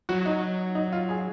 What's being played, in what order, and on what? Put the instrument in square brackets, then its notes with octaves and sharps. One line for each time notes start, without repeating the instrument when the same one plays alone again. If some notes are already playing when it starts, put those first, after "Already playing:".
[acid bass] F#3 [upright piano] F#4
[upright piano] D#4
D#4
F4
G#4